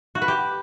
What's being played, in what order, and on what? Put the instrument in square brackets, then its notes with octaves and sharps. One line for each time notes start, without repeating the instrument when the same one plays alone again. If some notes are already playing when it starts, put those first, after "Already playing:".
[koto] F#4
B4
G4